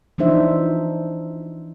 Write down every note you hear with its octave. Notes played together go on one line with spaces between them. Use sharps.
E3 F3 D4 D#4 C5 E5